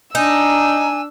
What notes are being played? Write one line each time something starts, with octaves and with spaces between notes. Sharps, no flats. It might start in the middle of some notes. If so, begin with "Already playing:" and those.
D4 D#4 G#5 E6